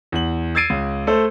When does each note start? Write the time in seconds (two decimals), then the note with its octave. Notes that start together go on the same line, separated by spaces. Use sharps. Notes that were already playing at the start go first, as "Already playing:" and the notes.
0.12 E2 F#7
0.55 E6 G#6 A6 C7 D7 D#7
0.70 C#2
1.07 A3 A4 C5